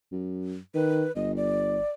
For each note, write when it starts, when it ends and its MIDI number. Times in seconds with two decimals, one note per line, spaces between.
0.12 0.57 42
0.75 1.05 51
0.75 1.12 71
1.16 1.79 31
1.16 1.32 75
1.37 1.90 74